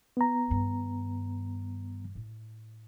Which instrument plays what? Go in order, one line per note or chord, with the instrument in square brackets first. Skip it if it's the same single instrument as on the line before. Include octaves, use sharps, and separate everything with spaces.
[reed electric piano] B3 A#5
[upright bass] G2 D#3
A2